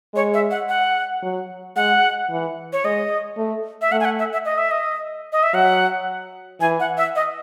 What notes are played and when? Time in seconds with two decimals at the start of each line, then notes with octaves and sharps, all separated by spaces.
0.15 G#3 C#5
0.34 E5
0.51 F#5
0.69 F#5
1.23 F#3
1.76 G#3 F#5
2.30 E3
2.73 C#5
2.85 G#3 D#5
3.38 A3
3.81 E5
3.92 A3 F#5
4.00 G#5
4.05 F#5
4.19 E5
4.33 E5
4.45 D#5
4.58 E5
4.71 D#5
5.32 D#5
5.43 E5
5.54 F#3 F#5
6.61 E3 G#5
6.80 F#5
6.97 E5
7.16 D#5